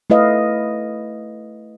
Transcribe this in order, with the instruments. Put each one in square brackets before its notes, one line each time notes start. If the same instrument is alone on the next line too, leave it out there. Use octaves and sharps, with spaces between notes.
[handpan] A3 E4 B4 D#5 F5